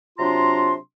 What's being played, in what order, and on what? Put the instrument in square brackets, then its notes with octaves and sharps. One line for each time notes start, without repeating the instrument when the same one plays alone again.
[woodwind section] C3 F#3 D4 F4 A#5 C6